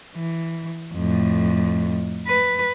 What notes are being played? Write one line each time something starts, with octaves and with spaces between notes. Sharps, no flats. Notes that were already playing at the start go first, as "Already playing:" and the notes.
E3
F2 A2
B4